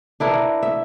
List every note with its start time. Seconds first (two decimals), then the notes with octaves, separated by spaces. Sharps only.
0.20 D4 E4 A#4 B4
0.63 E5